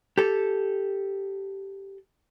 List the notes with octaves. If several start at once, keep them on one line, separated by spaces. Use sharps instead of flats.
G4 A4